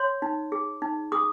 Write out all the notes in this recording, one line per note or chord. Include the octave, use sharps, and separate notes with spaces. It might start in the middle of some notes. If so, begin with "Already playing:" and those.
Already playing: C#5 C6
D#4
G#4
D#4
G#4 D#6